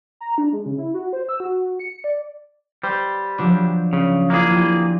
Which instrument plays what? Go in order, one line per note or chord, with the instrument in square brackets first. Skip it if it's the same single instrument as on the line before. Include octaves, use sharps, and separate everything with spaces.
[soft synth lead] A#5
D4
G#3
C#3
E4
F#4
C5
E6
F#4
C#7
D5
[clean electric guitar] G3 [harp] C5
[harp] F3 F#3 D4
[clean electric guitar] C#3
[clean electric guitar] A#3 G#4 [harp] D4 E4 F4
[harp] F3 F4 G4